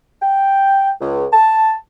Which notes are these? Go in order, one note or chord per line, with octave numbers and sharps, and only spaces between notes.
G5
C#2
A5